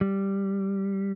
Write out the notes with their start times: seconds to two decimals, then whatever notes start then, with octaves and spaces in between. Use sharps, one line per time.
0.01 G3